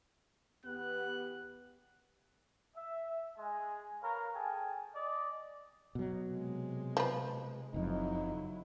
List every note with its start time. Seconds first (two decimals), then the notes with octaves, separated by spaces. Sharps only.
0.65 E2 B3 G4 F#6
2.76 E5
3.38 G#3 G#5
4.03 A#4 B4 C#5 F5
4.34 G#4 A4 G5 G#5
4.95 D5 D#5
5.95 B2 F#3
6.29 C3 G#3
6.97 F3 B4
7.74 F#1 F2 F#3 D#4 E4